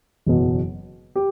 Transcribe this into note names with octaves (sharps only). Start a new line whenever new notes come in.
F#1 E2 B2 F#3
G4